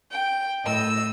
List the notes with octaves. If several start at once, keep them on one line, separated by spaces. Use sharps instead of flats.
G5
A2 D#5 E6